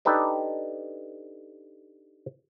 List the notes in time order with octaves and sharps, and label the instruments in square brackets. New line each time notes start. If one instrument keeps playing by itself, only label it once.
[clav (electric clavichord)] D4 D#4 G4 A4 B4 D5